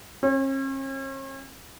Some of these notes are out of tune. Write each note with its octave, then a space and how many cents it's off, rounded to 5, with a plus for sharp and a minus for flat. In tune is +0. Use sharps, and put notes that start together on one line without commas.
C#4 -45